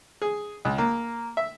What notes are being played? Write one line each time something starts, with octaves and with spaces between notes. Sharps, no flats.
G#4
C#2
A#3
E5